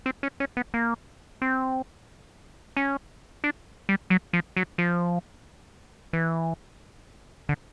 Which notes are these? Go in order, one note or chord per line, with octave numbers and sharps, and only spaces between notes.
C4
C#4
C#4
B3
A#3
C4
C#4
D4
G3
F#3
F3
F#3
F3
E3
D3